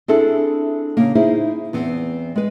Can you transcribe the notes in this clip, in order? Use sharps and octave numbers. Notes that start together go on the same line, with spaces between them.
C4 D4 E4 G#4 A4
C#3 A#3
D#4 E4 G#4 C5
E2 B3 C4
G#3 B4